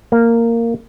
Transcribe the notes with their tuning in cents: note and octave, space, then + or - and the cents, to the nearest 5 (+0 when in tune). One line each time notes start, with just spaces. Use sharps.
A#3 -10